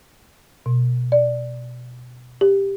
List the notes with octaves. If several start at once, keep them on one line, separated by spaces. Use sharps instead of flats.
B2
D5
G4